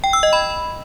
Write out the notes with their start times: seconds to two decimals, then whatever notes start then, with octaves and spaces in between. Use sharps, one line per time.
0.04 G5
0.13 E6
0.23 D#5
0.33 B5